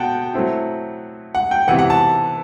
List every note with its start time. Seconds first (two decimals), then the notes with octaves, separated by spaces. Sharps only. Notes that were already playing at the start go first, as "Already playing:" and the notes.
Already playing: B2 F#5 G5 A5
0.34 F#3 A3 C4 E4
1.35 F#5
1.51 G5
1.67 C3 E3 B3 F#5
1.79 F#5
1.90 A5